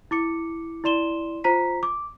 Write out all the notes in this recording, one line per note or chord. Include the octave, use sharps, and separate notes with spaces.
E4 D6 C#7
E4 D5 C6 E7 G7
F4 C5 A#5 B6
D6